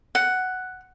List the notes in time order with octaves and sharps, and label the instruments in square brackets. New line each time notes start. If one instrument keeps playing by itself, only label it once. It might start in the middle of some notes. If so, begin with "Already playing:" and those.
[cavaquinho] F#5